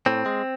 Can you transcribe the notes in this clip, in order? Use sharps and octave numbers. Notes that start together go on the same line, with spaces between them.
A2 C4
G#3